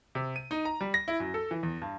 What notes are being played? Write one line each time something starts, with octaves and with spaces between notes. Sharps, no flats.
C3
D#7
D#4
A#5
G3
A#6
E4
F#2
A4
E3
E2
G2